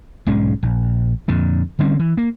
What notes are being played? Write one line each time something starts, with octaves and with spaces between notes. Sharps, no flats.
B1 G#2 G#3 C#4
A#1
F2 A#2 D3
D3 G3 C4 C#4
E3
A#3